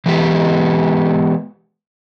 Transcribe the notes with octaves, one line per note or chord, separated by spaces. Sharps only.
E3 G#3 B3 G4